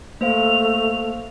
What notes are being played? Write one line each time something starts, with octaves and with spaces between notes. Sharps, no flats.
A3 A#3 C5 F5 F7